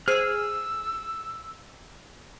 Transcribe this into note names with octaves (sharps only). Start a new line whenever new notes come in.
G#4 C5 E6 F6